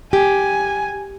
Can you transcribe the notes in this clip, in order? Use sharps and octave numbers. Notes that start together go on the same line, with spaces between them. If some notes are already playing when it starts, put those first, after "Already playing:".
G4 G#5